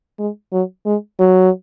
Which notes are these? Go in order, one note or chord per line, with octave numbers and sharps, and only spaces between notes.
G#3
F#3
G#3
F#3